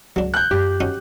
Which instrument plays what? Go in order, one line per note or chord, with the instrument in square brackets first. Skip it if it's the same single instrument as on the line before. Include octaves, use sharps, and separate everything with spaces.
[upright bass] C#2 [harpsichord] F#3 D4
[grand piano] F#6 G6
[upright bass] F#2 F4 [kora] G4
[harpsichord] C#4 D#4 F#4